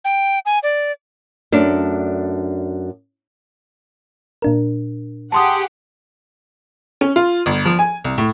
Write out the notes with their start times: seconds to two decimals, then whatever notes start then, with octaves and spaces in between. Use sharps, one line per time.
0.05 G5
0.46 G#5
0.63 D5
1.52 F#2 A3 D4
4.42 A#2 D4 A#4
5.32 G4 G#4 F#5 A5 C6 D#6
7.01 C#4
7.16 F4
7.46 G1
7.65 F3
7.79 G#5
8.04 C2
8.18 A2